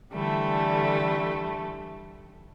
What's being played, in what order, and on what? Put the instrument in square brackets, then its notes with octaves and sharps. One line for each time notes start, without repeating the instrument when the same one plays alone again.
[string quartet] D3 E3 G3 A3 A4